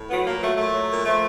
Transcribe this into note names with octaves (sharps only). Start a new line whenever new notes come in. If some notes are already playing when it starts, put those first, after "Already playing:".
Already playing: A2
F#3 B3
A#2 A#3
F#3 A3
A#2 A3
F#3
A#2
F3 A3